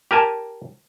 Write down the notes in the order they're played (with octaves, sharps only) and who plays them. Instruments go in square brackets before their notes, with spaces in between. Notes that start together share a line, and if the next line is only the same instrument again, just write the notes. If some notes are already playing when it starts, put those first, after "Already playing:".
[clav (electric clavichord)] G4 A#4 G#5 A5